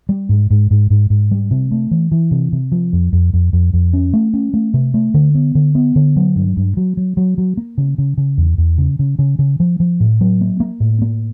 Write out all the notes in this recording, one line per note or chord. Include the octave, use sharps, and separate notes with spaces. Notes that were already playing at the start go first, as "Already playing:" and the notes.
G3
G#2
G#2
G#2
G#2
G#2
G3
C3
A3
E3
E3
C3
C3
F3
F2
F2
F2
F2
F2
C#4
A3
C#4
A3
C3
A3
D3
B3
D3
B3
D3
F#3
G2
G2
F#3
F#3
F#3
F#3
A#3
C#3
C#3
C#3
E2
E2
C#3
C#3
C#3
C#3
F3
F3
A2
F#3
A#3
A#3
A2
A#3